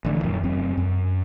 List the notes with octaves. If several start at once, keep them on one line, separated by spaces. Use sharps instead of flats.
A1 D3 E3
D#1 F#2
F1 F#2 C4
F#2